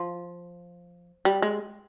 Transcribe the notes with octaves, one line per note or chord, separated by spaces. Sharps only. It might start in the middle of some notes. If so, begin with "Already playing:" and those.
Already playing: F3
G3
G#3